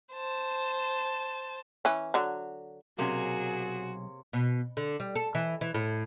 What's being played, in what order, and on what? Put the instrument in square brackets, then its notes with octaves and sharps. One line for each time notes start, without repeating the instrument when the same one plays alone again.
[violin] C5 A5
[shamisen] E3 C#4
D3 F#3
[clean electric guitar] B1 [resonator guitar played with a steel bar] C3 A#3 C#4 [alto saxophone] F#4 [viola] G#4
[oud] B2
D3
G3
A4
E3
E3
A2